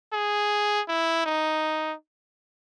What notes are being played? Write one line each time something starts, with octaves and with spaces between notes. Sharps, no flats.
G#4
E4
D#4